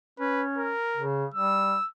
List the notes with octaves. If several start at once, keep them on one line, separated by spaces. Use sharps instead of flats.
C#4 B4
A#4
C#3
G3 E6